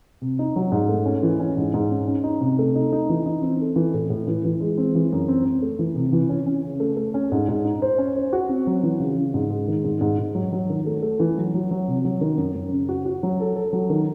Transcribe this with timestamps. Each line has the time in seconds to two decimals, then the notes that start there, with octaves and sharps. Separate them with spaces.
0.22 C3
0.39 D#4
0.56 F#3
0.72 G#2
0.89 A3
1.06 C#4
1.23 E3
1.40 C#4
1.57 G#2
1.74 G#2
1.91 C#4
2.07 C#4
2.24 D#4
2.41 C3
2.59 A3
2.75 D#4
2.92 D#4
3.09 E3
3.26 D#4
3.42 C4
3.60 A4
3.76 E3
3.94 A2
4.10 A2
4.27 E3
4.44 E3
4.61 G#3
4.77 C4
4.95 E3
5.12 F#2
5.28 C4
5.45 C4
5.62 A3
5.79 E3
5.95 C3
6.13 E3
6.29 C#4
6.47 C#4
6.64 C#3
6.80 A3
6.97 A3
7.14 C#4
7.32 G#2
7.49 G#2
7.65 D#4
7.82 C5
7.98 C#4
8.16 C5
8.33 F#4
8.49 C4
8.67 F#3
8.83 E3
9.00 C#3
9.17 C#3
9.34 G#2
9.50 G#3
9.68 D#3
9.85 G#2
10.01 G#2
10.18 G#2
10.35 F#3
10.52 F#3
10.70 D#3
10.86 A3
11.02 A3
11.20 E3
11.37 F#3
11.54 F#3
11.71 F#3
11.88 C3
12.05 F#3
12.21 D#3
12.37 F#2
12.55 F#2
12.72 C#3
12.89 F#4
13.06 F#4
13.23 F#3
13.40 A4
13.56 A4
13.73 F#3
13.90 D#3